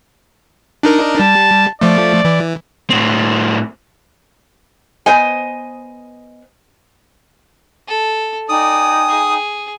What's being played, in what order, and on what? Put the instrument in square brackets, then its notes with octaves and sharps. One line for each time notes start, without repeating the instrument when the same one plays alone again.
[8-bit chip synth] D4 D#4 A#4
[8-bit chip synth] G3 [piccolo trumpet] A5
[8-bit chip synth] F3 A3 [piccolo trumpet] D5
[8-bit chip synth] E3
[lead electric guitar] A2 C4
[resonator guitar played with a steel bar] B3 C5 D#5 G#5
[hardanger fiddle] A4
[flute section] D#4 G5 G#5 [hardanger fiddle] D5 [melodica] D#6
[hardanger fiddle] G#4